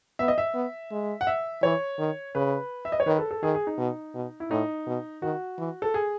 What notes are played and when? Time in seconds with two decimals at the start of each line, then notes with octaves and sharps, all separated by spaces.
0.19 B3 E5
0.28 D#5
0.38 E5
0.55 B3
0.92 G#3
1.21 F#5
1.27 E5
1.63 E3 C#5
1.99 D#3
2.35 C#3 B4
2.85 E5
2.92 D#5
3.00 C#5
3.06 D#3 B4
3.19 A4
3.31 A4
3.43 D#3 G#4
3.55 G#4
3.67 D#4
3.78 B2
4.15 B2
4.40 E4
4.51 A2 D#4
4.87 B2
5.22 D#3 F#4
5.59 E3
5.82 A4
5.94 G#4